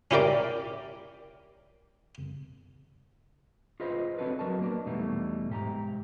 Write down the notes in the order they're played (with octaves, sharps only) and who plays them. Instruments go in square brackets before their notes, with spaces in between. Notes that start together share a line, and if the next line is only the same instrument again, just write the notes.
[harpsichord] C#4 E4 G4 A#4 D5
[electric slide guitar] F4 G#4 B4 C5 D#5
C4 D4 F#4 A4 B4 C#5
F#3 F#4 A#4 D#5 A5
A#3 B3 D4 A#4 B4
E2 B2 G3 A3 D#4
G#2 G4 A5 A#5